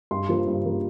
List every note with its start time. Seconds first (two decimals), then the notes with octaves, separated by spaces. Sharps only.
0.11 G2 C6
0.29 F3 A#3
0.47 G2
0.65 F3 A#3